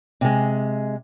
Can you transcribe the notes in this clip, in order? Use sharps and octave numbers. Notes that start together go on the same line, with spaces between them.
C3 G#3